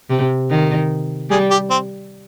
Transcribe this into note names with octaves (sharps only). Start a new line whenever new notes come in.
C3
D#3
G3 G#4
G4
C4